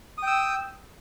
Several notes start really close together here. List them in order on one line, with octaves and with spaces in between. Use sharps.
D#6 G5 E6